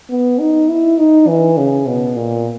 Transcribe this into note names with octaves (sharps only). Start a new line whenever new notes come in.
B3
D#4
E4
D#4
E3
C#3
B2
A#2